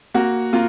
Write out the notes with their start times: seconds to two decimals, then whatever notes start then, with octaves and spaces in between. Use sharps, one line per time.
0.14 A#3 F#4
0.53 A#3 F4